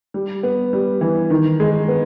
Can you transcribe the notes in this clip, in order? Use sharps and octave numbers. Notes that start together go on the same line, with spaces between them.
G3
B3
G3
E3
D#3
G#3
B3